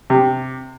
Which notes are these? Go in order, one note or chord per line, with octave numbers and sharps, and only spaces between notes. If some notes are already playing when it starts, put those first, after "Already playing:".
C3